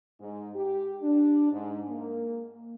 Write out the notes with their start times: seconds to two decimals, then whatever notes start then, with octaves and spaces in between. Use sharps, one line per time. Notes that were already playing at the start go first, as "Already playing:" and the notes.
0.20 G#2
0.55 G4
1.03 D4
1.52 G#2
1.89 A#3